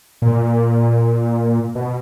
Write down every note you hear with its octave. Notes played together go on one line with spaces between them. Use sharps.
A#2
B2